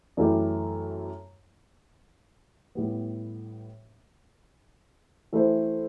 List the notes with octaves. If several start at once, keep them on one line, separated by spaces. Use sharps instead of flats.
F#2 E3 A3 E4 G4
A2 G3 B3
E3 A3 E4 G4 C5